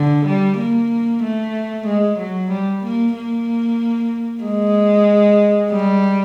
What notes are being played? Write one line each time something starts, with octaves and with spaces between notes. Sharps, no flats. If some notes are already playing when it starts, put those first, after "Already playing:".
Already playing: D3
G3
A#3
A3
G#3
F#3
G3
A#3
A#3
G#3
G3